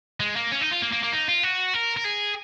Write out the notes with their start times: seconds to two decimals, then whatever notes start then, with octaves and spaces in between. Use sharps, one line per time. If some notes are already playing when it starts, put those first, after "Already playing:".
0.20 G#3
0.36 A#3
0.52 C#4
0.61 D#4
0.71 F4
0.82 A#3
0.92 A#3
1.03 A#3
1.12 D#4
1.28 F4
1.43 F#4
1.74 A#4
1.97 A#4
2.05 G#4